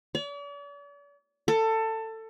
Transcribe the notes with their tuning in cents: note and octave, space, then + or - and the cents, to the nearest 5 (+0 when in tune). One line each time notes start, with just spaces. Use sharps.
D5 -45
A4 +20